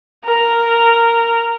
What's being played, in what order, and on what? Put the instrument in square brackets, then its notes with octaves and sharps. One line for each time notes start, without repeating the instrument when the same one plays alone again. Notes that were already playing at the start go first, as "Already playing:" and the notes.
[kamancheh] A#4